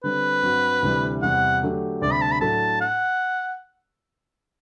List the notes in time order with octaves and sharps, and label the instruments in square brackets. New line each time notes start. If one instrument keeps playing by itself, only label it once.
[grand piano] D3 G3 C4 [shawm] B4
[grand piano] G2 F#3 C4 F#4
D2 C3 E3 G3
[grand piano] E2 C3 G3 [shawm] F#5
[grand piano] D3 F#3 A3 D4 G4
[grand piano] D2 C3 G3 [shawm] D5
[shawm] B5
A5
B5
[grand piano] A2 F#3 A3 D4 A4 [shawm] A5
[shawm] F#5